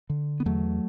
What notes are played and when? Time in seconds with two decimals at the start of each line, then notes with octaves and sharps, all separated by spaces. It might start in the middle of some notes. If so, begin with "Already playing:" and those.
0.10 D3
0.40 B3
0.46 E2 F#3 A3